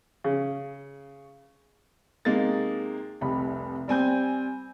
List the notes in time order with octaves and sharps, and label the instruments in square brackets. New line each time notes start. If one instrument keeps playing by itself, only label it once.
[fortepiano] C#3
[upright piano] C3 G#3 A#3 D#4 A6
F1 C2 B5
G3 C4 G#5 G6